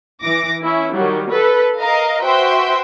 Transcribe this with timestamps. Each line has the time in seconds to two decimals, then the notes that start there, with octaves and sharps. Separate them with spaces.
0.22 E3 D6 A#6
0.63 C#4 E4 E5
0.95 D#3 F#3 G3
1.29 A4 B4
1.80 A#4 D#5 F5 A#5
2.22 F#4 B4 C5 E5 G5 C6